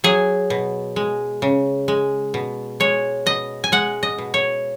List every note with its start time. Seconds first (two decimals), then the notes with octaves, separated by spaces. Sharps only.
0.04 F#3 G#4
0.50 B2
0.96 G#3
1.42 C#3
1.88 G#3
2.34 B2
2.80 G#3 C#5
3.26 B2 D#5
3.64 G#5
3.72 G#3 F#5
4.03 D#5
4.18 B2
4.34 C#5